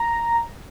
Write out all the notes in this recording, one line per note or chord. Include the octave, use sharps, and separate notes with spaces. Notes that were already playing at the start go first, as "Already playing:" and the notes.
Already playing: A#5